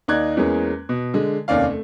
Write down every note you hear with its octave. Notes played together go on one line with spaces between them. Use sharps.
D#2 D#4 D5 F#6 G#6
E2 G#3 A#3 C#4
B2
D3 G#3
F1 D#2 C#4 D5 F5
A3